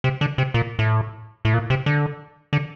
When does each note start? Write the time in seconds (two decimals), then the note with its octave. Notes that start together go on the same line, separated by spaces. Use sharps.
0.04 C3
0.21 D3
0.38 C3
0.54 A#2
0.79 A2
1.45 A2
1.54 A#2
1.70 C3
1.86 D3
2.53 D3